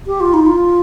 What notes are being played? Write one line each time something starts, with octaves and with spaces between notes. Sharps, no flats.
G4
F4
D#4
F4